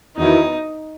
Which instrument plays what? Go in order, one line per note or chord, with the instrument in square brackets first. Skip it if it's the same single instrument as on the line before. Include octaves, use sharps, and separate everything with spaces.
[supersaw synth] E2 D#3 F#3 B3 E4 [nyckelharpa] D#4